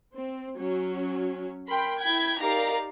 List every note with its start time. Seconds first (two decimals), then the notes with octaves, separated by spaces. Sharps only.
0.14 C4
0.57 F#3 C#4
1.68 A#4 G5 B5 C6
2.00 E4 G5 B5 G#6
2.41 D#4 G4 A#4 D5 F5 A#5